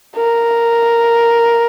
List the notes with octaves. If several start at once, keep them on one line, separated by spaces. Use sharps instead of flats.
A#4